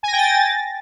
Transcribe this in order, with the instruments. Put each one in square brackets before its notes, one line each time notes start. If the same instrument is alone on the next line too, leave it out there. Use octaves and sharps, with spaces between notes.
[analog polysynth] G#5
A#6
G5
A6